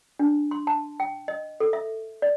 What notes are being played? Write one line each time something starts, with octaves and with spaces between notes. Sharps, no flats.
D4
C6
A5
G5
D#5
A4
E5
D5